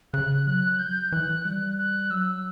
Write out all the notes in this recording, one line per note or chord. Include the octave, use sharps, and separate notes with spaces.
C#3 F#6
F#3 F#6
G6
E3 F#6
G3 F#6
F#6
F#3 E6